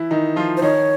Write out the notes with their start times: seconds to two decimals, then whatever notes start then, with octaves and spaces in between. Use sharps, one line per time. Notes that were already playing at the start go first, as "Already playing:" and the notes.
Already playing: E3 E4
0.11 D#3 D#4
0.36 F3 F4
0.57 C5
0.62 D#3 D#4 C#5